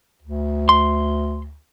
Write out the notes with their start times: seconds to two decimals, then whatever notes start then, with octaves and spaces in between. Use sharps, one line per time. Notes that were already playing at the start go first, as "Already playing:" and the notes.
0.22 D2
0.69 C6